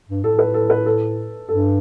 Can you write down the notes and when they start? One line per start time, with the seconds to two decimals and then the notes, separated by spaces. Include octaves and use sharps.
0.09 G2
0.24 A2 A4
0.39 B4
0.54 A4
0.70 B4
0.86 A4
1.49 G2 A4